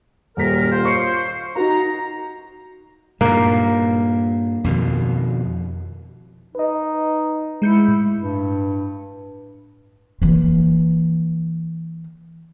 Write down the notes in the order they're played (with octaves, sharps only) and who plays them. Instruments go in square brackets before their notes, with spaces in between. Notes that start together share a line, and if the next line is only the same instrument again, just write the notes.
[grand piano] D#1 B6 [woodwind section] F#2 A#4
[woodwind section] F4 C5
[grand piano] C#6 C7 C#7
[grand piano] D#4 F#4 [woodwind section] A#5
[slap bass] G2 A#2 [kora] A#3
[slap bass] F2 B2 D#3
[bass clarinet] D#4 [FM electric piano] B4 D#5
[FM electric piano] G#3 G6 C#7 [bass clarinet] E4
[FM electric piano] A2
[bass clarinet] G2
[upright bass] E3 A#3